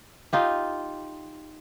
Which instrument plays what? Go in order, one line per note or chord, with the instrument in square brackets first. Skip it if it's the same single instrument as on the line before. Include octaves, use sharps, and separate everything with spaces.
[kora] D#4 F4 G4